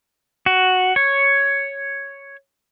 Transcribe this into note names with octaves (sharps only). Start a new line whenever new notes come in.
F#4
C#5